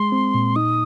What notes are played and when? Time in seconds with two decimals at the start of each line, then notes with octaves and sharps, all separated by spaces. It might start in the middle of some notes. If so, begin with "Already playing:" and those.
Already playing: G#3 C6
0.12 C4
0.34 A#2
0.56 D#4 D#6